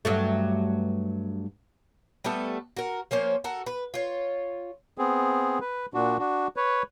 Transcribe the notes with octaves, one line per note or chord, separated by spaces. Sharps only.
G2 F#3 A3
G3 A3 B3 A4
F#4 A#4
F3 A#3 C#4 C5
F#4 A4 A#4
B4
F4 C#5
B3 C4 G#4
B4
A#2 D4 F#4
D4 F#4
B4 C#5